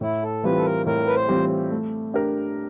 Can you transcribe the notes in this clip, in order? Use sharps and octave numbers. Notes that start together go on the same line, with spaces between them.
A2 E4
A4
E3 G3 C4 F4 B4
A4
A#4
A2 A#4
B4
C5
E3 G3 C4 F4
A3
D4 G4 A#4